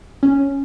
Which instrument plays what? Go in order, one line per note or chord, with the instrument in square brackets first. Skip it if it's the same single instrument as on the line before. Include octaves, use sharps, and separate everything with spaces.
[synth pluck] C#4